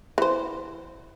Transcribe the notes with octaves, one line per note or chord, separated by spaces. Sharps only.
E3 C5